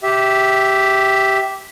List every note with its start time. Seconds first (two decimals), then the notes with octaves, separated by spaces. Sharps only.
0.03 G4 E5